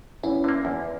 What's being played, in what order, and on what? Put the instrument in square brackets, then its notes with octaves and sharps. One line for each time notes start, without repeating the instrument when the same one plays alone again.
[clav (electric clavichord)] E2 [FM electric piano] C#4 E4
[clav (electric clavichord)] D3 A#3
E2